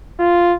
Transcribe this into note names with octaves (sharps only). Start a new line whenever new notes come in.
F4